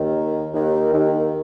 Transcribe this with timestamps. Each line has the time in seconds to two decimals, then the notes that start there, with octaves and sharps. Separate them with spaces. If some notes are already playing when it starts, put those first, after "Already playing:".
Already playing: D#2 D#3
0.54 D#2 D#3
0.93 D#2 D#3